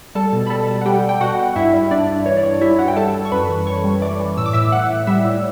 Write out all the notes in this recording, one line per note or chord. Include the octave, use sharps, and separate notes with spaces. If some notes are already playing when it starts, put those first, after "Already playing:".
G3 A4 A5
B2
B5
G3 A4 A5
G3
F#5
G3 G4 G5
G3
G5
B2 F#4 F#5
B2
G2 E4 E5
G3
G2 D4 D5
G2
E3 C#5
D5
G2 C#5
G3 E4 E5
G2 F#4 F#5
G5
G3 A4 A5
G3
C#6
F#2 B4 B5
E3
E3 C#5 C#6
G3
E3 D5 D6
E3
A2 E6
D6
A2 E5 E6
A2 F#5 F#6
A2
G3 E5 E6
A2